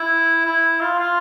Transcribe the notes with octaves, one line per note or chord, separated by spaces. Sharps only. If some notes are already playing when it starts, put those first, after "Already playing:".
Already playing: E4
E4
F4
F4